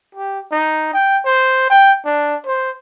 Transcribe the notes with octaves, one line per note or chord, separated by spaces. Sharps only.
G4
D#4
G5
C5
G5
D4
C5